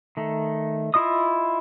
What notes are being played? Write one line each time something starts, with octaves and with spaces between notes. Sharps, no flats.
D#3 A3
E4 F4 D#5 D#6